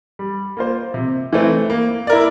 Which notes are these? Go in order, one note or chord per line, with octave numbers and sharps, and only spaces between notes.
G3
A#3 F4 C5
C3
E3 A3 C4
A#3
E4 A#4 D5